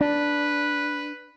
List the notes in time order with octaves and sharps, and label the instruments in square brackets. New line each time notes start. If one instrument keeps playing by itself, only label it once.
[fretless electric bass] D4 [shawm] B4